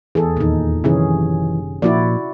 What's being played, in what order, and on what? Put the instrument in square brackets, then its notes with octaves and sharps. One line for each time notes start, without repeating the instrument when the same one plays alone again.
[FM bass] E2 [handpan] G#4 A4
[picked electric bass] D#2 D#3 [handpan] A#2 D#4
[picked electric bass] F#1 F#2 D#3 [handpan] C3 C#4 G#4 [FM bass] E3
[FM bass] A#2 [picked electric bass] F3 [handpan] E4 F#4 D5